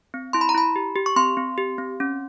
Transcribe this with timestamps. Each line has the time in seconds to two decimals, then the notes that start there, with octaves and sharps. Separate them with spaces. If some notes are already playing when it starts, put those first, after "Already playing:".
0.14 C4
0.33 E4 C6
0.41 B5
0.49 A#5
0.55 E4 B5
0.76 G4
0.96 G4
1.06 C#6
1.16 C4 C6
1.37 C4
1.58 G4
1.78 C4
2.00 C#4